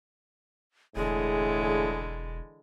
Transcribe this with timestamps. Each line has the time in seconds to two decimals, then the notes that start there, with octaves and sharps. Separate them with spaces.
0.96 E1 A2 D3 E3 G#3 G#4